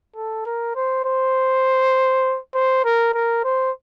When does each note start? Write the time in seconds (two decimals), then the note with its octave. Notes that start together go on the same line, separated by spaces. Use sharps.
0.16 A4
0.46 A#4
0.76 C5
1.05 C5
2.54 C5
2.85 A#4
3.14 A#4
3.44 C5